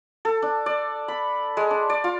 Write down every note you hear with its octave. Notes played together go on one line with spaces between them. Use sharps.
A4
D4
D5
B5
G#3
D4
D5
F4